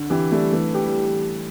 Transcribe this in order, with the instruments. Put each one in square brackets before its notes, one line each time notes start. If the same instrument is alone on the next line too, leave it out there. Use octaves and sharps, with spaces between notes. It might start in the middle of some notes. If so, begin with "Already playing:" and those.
Already playing: [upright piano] D3
[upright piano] E3 [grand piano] G4
[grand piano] G3 [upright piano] A3
[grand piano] E3 [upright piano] A3
[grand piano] G4
[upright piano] G3